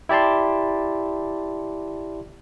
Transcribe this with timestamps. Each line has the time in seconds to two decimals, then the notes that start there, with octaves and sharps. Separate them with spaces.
0.09 E4 G4 D5 A5 C6